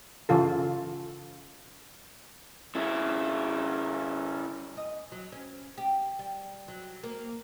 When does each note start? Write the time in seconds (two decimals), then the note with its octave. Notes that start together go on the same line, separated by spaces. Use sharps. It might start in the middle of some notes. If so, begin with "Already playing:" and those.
0.29 C#3 E3 F4 A4
2.75 C#3 E4
4.77 D#5
5.12 F#3
5.32 C#4
5.78 G4
6.19 G3
6.68 F#3
7.04 A#3